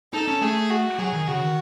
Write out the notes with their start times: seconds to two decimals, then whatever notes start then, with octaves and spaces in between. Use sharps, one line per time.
0.13 D#4 A4
0.28 C#4
0.42 A3 G#4
0.71 F#4
0.99 F#3 G#4
1.13 D#3
1.27 C#3 F#4
1.41 D#3